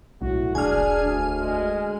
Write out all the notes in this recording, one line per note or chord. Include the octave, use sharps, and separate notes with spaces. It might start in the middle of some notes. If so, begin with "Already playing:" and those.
B1 A2 F#4
E1 D4 G#4 G#5 F6
D2
G#3